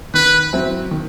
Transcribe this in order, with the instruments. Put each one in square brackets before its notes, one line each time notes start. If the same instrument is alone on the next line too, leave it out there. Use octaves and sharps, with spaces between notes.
[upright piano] D#3 [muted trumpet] B4
[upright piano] F#3 C4 E4
D#3